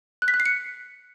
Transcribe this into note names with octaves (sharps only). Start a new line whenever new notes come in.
F#6
B6
F#6
C7
C#7